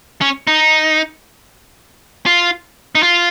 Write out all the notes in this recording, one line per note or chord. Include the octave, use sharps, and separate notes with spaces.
C#4
D#4
F4
D#4
F4